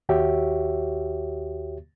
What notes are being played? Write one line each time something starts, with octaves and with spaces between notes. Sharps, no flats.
D#2 F#4 G4 C#5 E5